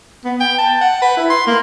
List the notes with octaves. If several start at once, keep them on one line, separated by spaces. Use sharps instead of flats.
B3
G5
A5
F#5
B4
E4
C6
A#3